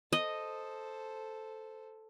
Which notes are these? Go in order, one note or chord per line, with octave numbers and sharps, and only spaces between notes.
A4 C5 D#5